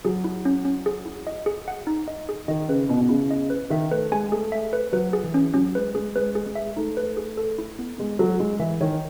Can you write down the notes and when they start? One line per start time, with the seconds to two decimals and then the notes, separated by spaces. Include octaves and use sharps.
0.05 F#3 G#4
0.24 E4
0.45 C#4
0.65 C#4
0.86 G#4
1.06 E4
1.27 D#5
1.46 G#4
1.68 F#5
1.87 D#4
2.08 D#5
2.29 G#4
2.48 D#3 D#5
2.69 C#3 B4
2.89 B2 E4
3.01 B2
3.09 C#3 E4
3.31 D#5
3.50 B4
3.70 D#3 E5
3.91 A3 B4
4.12 G#3 G#5
4.32 A3 G#4
4.52 E5
4.73 B4
4.92 F#3 B4
5.13 G#4
5.24 E3
5.34 C#4
5.54 F#3 C#4
5.75 G#3 B4
5.95 G#3 G#4
6.16 G#3 B4
6.35 G#4
6.46 G#3
6.55 E5
6.77 A3 D#4
6.97 B4
7.17 G#4
7.37 A4
7.58 E4
7.79 B3
7.98 G#3 B3
8.19 F#3 A4
8.40 G#3 E4
8.59 E3 E5
8.80 D#3 C#5